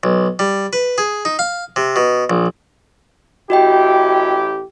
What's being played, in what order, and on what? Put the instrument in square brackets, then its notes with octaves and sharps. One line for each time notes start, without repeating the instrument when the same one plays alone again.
[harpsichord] B1
G3
B4
G#4
D#4
F5
C3
B2
A#1
[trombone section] A1 E4 G4 [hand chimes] F#4 D#5 G5